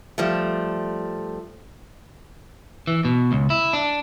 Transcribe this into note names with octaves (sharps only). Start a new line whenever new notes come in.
F3 G3 A3
E3
B2
C#2
E4
D4